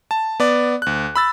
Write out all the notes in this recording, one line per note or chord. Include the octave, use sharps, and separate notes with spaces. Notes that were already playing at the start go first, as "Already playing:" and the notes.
A5
B3 D5
D2 F#6
B5 E6 A6